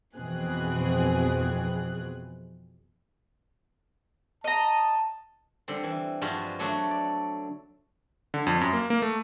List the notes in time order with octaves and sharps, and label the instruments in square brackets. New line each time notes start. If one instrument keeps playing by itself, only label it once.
[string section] F2 B2 E3 C4 G#4 F#6
[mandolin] D#5 A#5 [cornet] A5
[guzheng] D3 G3 C4
E3
G2 F3 G3 G#3 F4 F#4
D3 F#3 A3 D4 F#4
D5
[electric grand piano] D3
F2
F#2
A#3
A#3
A3